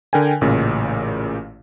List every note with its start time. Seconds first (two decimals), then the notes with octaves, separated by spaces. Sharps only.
0.13 D3 A#4 G5 G#5
0.41 A1 A#2 C#3